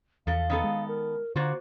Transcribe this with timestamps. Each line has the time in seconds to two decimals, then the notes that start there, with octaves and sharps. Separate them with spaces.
0.27 E2 F3 A4 F5
0.50 D#3 B3 A4
0.64 G#3
0.88 A#4
1.36 D3 A#3 F4 F#4 C5